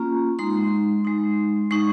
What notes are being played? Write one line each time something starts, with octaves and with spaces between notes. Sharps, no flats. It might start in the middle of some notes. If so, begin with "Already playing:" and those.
Already playing: A#3 C#4 F4 A#5
G#3 D#4 C6
G#3 D#4
G#3 D#4 C#6